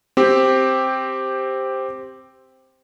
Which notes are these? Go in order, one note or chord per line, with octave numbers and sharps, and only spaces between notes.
C4 G4